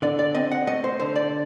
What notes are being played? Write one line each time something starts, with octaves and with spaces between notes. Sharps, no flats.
D3 D5
D5
C4 D#5
F#5
A3 D#5
C5
D3 C5
D5